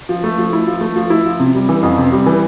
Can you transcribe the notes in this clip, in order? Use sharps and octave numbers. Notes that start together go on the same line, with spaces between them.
F3
A3
F3
E4
F3
A3
F3
E4
F3
C3
G3
E3
F2
C3
G3
E3